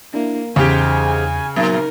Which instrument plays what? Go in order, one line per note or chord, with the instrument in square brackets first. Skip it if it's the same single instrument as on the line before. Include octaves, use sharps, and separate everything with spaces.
[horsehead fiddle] A#3 [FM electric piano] D4 E4
[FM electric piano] E2 [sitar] G#2 G4 [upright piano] C#3 [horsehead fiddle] G#5
[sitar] A#2 [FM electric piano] F#3 [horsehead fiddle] D#4 A#4